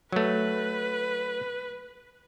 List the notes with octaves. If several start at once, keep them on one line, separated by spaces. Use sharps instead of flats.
F#3 A3 B4